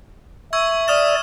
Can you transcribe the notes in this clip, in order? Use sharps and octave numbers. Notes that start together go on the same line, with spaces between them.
E5 C#6 E6 G#6
D5 D#6 F6 E7